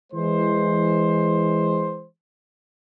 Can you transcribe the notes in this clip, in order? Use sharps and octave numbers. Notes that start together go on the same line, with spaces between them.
E3 G#3 C5